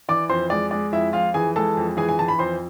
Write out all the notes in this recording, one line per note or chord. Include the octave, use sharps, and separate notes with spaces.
E3 D5 D6
F2 C5 C6
G#3 D5
G#3 D5
F2 E4 E5
F2 F4 F5
E3 G#4 G#5
G#3 A4 A5
F2
E3 G#4 G#5
G#5
E3 A5
B5
F2 C5 C6